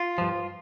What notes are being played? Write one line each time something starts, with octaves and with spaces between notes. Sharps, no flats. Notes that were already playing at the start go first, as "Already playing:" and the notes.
Already playing: F4
G2 F3